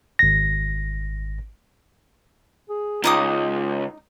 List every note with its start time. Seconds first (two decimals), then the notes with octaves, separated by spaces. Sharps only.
0.19 G#1 A#6
2.69 G#4
3.04 C#2 D#4 F4 D6 D#6